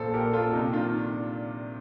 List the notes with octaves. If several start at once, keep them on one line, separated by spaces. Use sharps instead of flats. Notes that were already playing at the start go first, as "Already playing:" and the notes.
Already playing: A#1 A#2 A4 C5
A#2 G4 A#4
A#2 F4 A4
C3 D#4 G4
D#3 D4 F4